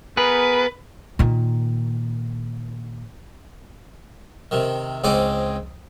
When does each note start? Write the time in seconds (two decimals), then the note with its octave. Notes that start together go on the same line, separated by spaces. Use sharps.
0.17 B3 G#4 A#4 B4
1.19 A#2 D#3
4.51 C3 D#3
5.04 C#2 G#2 C4 G#4 D#5 D6